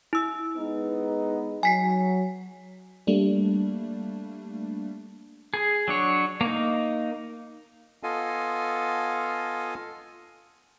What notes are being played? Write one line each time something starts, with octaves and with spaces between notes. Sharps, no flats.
E4 E6
G#3 B3 D#4
F#3 G#5 B6 C7
G3 A3 A#3 D4
G#4
F#3 D4 C#5
A#3 D#4
B3 F4 A4 D#5 F5 G#5